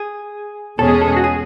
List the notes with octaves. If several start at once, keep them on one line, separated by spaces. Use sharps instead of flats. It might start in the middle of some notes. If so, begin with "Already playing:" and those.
Already playing: G#4
E2 B2 G#3 C#4 G#4 A4
A4
F#4
G#4